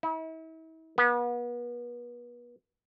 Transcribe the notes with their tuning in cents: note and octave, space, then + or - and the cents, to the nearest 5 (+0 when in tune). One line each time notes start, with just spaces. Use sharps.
E4 -40
B3 -35